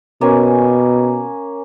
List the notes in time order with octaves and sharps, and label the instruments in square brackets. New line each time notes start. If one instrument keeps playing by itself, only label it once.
[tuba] B2 [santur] A#3 C#4 G#5